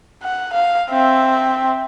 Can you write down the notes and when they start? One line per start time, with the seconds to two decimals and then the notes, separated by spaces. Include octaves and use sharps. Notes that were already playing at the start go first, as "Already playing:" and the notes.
0.23 F#5
0.53 F5
0.90 C4 E5